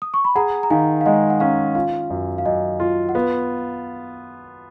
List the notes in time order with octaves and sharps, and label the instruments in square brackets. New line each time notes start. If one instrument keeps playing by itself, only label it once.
[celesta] D#6
C#6
B5
[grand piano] G#4 [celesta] F#5 A#5
[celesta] A#5
[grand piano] D#3 [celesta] F5 G#5
[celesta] F5
[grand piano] G#3 [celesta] D#5 F#5
[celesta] F#5
[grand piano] C#4 [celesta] F5
[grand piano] F4 [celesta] F5
[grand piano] F#2
[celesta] F5
[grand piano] F#2 [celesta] D#5
[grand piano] F4
[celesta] F#5
[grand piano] B3 [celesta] F5